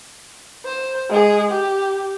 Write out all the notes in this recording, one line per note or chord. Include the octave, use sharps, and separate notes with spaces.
C5
G#3 G#4
G4